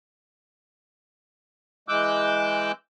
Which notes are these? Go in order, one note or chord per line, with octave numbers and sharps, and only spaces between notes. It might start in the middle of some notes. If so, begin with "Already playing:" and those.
E3 G#3 D6 E6 F#6 G6